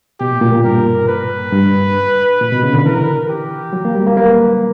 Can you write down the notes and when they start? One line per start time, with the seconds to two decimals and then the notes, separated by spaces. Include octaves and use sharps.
0.20 B2 G4
0.31 A#2
0.42 A#2
0.53 A#2
0.64 G2 A#4
1.08 B4
1.52 G2
2.41 A#2
2.52 B2
2.63 C#3
2.74 D3
2.85 E3 A#4
3.29 G4
3.73 F#3
3.85 A#3
3.95 G3
4.07 A#3
4.17 A#3 B4